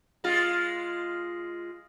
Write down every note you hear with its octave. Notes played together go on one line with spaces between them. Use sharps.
G#3 F4